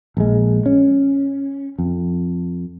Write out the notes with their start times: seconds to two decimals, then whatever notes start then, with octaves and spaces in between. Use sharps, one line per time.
0.17 A#1 G#3
0.66 C#4
1.79 F2